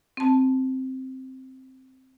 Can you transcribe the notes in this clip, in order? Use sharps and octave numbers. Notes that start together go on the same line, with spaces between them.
C4 A5